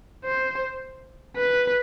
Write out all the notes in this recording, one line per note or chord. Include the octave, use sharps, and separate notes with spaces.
C5
B4